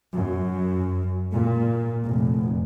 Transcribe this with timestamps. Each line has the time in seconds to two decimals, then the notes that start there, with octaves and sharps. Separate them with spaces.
0.13 F#2
1.32 A#2
2.05 F1